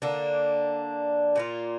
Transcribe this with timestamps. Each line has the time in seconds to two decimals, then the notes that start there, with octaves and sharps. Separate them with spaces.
0.02 D3 A#3 D4
1.36 A#2 A#3 F4